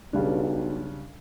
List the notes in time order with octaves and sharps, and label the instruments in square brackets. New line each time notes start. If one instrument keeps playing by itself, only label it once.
[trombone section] B1 [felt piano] C#3 G3 D4